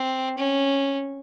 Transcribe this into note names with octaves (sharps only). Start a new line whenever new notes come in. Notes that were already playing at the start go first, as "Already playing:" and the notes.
Already playing: C4
C#4